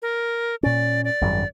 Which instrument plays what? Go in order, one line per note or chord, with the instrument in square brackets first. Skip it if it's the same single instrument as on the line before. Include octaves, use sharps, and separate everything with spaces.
[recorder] A#4
[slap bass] A#2 C#4 [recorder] D5
[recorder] D5
[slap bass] G#1 F#2 G3